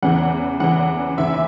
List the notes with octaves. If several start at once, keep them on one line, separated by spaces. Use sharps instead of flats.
E2 C#3 E3 F#5
E2 C#3 E3 F#5
D#2 C#3 E3 E5